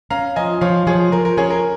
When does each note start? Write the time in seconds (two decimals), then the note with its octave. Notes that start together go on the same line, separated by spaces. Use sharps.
0.10 C#4 F5 A#5
0.36 F3 D#5 G#5
0.61 F3 C#5 F5
0.87 F3 G#4 C#5
1.12 F3 A#4
1.25 A#4
1.37 C#4 G#4 C#5
1.50 A#4